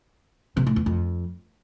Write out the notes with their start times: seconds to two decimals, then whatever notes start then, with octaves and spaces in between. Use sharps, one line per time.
0.57 C3
0.66 A2
0.76 E2
0.86 F2